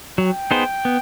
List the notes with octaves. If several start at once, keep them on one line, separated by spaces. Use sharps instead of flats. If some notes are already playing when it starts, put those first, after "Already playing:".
F#3 G5
B3 D#4 G#4 C5
B3